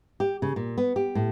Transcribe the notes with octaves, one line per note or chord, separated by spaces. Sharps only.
G4
C#3
A#2
B3
G4
A2